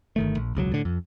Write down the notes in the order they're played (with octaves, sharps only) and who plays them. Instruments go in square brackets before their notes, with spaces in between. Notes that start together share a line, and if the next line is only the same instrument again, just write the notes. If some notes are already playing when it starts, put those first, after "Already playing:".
[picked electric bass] G1 D#3 A3
A#1
E1 C#2 B2 F#3
A2 D3
F2